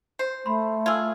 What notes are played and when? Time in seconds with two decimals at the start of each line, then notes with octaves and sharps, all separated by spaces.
0.19 C5
0.46 A3 B5 C6
0.86 F4 G#4 E6 G#6